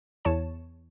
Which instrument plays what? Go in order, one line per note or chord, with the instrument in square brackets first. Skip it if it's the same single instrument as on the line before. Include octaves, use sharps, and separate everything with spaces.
[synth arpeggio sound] E2 E3 C#5 A5 E7